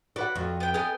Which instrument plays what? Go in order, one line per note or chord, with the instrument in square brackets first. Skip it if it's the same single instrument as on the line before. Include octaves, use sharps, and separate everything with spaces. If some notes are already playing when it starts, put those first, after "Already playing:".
[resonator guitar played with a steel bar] F#4 B4 F#5 [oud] D5
[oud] F2 [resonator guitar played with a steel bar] F#4
[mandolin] B3 G5
[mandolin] B3 G5 G#5 [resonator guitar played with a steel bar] G#4 A4 D#5